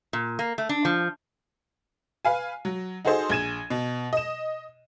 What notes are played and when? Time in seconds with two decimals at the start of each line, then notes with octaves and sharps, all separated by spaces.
0.13 A#2
0.39 A#3
0.58 A3
0.69 D4
0.85 F3
2.25 B4 F5 G#5
2.65 F#3
3.05 D#4 F#4 G#4 A4 C5 D#5
3.30 A#1 G#4 G#6 D#7 E7
3.70 B2
4.13 D#5 E7